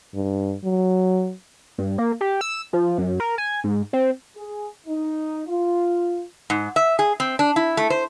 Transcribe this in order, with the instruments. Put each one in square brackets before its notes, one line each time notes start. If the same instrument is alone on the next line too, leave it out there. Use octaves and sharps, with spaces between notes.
[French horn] G2
F#3
[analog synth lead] G2
A#3
G4
E6
F3
F#2
A#4
G#5
G#2
C4
[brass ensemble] G#4
D#4
F4
[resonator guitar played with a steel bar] G#2
E5
G#4
C4
D4
E4
A3
C5